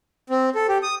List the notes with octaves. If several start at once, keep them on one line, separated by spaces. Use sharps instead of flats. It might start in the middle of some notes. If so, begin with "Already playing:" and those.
C4
A4
G4
D#6